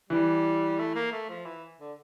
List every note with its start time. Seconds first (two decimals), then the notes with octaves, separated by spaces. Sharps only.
0.09 E3 G3
0.78 A3
0.95 A#3
1.12 A3
1.29 F3
1.45 E3
1.80 D3